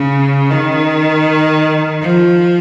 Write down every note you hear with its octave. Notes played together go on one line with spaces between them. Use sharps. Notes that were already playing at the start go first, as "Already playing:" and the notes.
Already playing: C#3
D#3
F3